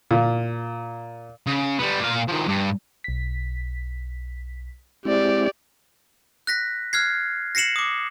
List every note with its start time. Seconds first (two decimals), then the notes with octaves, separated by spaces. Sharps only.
0.11 A#2
1.46 C#3
1.79 G3 B3
2.00 A#2 F5
2.28 D#3 F3
2.48 G2
3.04 B1 B6
5.05 G#3 C4 E4 G4 D5
6.47 F#6 A#6 B6
6.93 F6 F#6 G#6 C7
7.55 A#6 C7 C#7 E7 F#7
7.76 D6 D#6